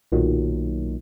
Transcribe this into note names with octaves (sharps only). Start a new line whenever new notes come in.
B1 A#2 D#3 F#3